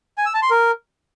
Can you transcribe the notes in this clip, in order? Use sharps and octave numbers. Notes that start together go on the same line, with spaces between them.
G#5
E6
A5
C6
A#4